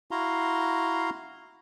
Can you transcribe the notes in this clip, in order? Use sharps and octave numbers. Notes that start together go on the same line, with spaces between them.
E4 F#4 F5 A#5 C6